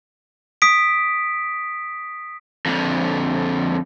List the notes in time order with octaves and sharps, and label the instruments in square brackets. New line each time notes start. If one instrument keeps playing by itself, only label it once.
[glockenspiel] D#6 B6 D7
[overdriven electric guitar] F2 D3